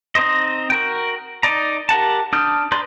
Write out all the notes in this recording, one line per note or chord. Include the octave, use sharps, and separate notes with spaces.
C4 D#4 C5 D#5
F#4 A#4 G5
D#4 D5 A#5
G4 A#4 F#5 A5
D4 D#6 F6 G6
B4 D5 A#5 C6 G6